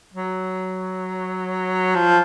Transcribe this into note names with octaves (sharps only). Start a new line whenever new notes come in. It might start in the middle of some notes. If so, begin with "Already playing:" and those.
F#3
F3